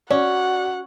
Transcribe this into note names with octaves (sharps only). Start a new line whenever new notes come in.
C#4 F#4 D5 F#5